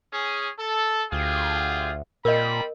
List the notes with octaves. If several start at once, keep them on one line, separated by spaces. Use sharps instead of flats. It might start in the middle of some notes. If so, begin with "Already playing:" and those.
C#4 G#4
A4
D2 F4 G4 G#4
A#2 G3 C4 A#4 D#5 B5